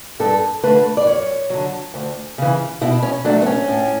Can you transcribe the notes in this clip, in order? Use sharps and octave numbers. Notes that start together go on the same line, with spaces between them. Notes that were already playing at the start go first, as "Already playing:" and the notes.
G2 A4
D3 A3 B4
D5
F#2 C#5
D3 F#3
D2
C#3 E3
B2 E4
C#4
F#3 A3 D4
B3
C#4
A2